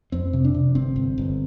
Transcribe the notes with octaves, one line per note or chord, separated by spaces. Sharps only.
F2 C4
C3
D4
C3
G1 C4
G1
G1